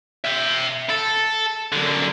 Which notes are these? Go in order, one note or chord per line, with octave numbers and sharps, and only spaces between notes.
E5 G5
A4
F#2 D3